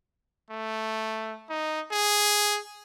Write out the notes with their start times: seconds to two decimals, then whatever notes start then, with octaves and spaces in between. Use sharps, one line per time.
0.50 A3
1.50 D#4
1.92 G#4